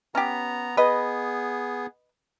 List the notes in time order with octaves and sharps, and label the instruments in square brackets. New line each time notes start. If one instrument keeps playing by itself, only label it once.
[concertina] B3 A#5 [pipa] C#4 G4
[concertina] B3 G#4 [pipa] B4 D#5